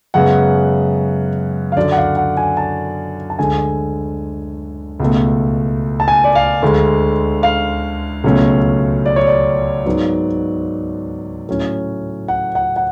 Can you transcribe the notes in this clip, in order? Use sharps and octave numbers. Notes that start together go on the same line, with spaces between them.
F#2 C#3 G#3 B3 F#5
F5
F#2 D3 F#3 D5
F#5
F5
F#5
G#5
A5
A5
D2 D3 G#3 G#5
C#2 B2 A3
A5
G#5
D5
F5
D2 D3 G#3
F5
C#2 B2 F#3 A3 C#4
D5
C#5
D5
G#2 F#3 B3
A2 F#3 C#4
F#5
F#5
F#5